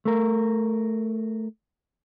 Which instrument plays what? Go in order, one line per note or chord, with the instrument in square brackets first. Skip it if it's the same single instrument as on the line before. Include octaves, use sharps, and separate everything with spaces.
[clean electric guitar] A3 A#4